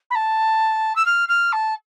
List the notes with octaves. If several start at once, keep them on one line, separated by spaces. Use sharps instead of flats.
B5
A5
E6
F6
F6
A5